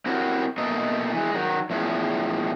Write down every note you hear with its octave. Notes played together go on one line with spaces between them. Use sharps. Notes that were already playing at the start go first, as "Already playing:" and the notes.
C4 E4 F#4 G4 A#4 C#5
B2 A3 A#3 A4 D#5
E3 G#3
D#3 F#3
E2 A2 F3 G#3 C#4